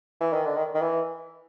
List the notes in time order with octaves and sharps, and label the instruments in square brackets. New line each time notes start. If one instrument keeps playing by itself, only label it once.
[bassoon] E3
D#3
D3
D#3
D#3
E3